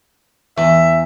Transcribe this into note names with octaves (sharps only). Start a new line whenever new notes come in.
E2 E5